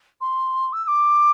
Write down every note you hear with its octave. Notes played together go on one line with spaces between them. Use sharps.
C6
E6
E6
D6